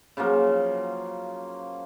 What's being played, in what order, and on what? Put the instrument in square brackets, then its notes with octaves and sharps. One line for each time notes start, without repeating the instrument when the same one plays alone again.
[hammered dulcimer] C#3 F3 F#3 A#3